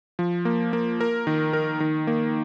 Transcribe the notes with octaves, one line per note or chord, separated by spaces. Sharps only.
F3
A#3
A#3
A#4
D#3
A#4
D#3
A#3